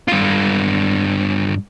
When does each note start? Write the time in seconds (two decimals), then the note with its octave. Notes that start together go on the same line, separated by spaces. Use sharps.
0.08 G2 F4